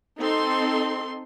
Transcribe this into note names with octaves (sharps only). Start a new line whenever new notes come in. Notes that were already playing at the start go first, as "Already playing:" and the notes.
C4 D#4 A4 C6